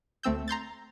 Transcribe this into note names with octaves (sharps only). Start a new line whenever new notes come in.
D2 A3 C4 E6 G6
A#5 C6 G6 A6